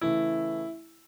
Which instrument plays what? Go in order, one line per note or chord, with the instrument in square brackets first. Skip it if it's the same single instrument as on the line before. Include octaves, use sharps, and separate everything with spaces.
[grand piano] C#3 E3 A3 E4